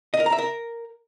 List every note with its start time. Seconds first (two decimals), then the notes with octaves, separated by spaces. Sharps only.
0.14 D#5
0.20 A#4
0.26 A#5
0.32 E5
0.38 A#4